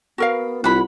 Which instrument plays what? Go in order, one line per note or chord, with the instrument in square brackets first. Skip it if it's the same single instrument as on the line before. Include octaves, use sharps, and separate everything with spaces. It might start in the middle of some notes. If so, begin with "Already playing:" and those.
[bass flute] B3 [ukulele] F#4 A#4 F5
[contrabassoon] C2 [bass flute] F4 [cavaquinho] F#5 B5